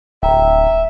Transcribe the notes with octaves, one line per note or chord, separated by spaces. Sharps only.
D1 E5 G5 A#5